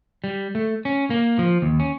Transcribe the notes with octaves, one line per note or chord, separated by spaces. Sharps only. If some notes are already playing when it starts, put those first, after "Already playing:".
G3
A3
C#4
A#3
F3
D#2
C#4